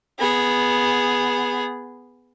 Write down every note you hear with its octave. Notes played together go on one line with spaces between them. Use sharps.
B3 G#4